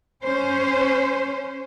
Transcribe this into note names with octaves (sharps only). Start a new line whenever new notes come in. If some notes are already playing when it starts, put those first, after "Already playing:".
C#4 C5